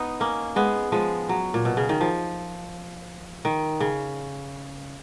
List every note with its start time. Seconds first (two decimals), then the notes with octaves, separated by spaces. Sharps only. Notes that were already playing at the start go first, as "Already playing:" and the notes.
Already playing: B3 D#4
0.20 A#3 C#4
0.56 G#3 B3
0.92 F3 G#3
1.29 F#3
1.54 A#2
1.65 B2
1.77 C#3
1.89 D#3
2.01 F3
3.45 D#3
3.80 C#3